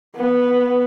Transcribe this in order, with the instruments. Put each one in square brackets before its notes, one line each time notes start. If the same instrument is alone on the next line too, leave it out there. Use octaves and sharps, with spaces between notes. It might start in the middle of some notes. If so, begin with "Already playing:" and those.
[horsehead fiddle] B3